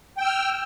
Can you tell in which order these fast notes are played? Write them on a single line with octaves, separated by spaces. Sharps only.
G5 E6 F6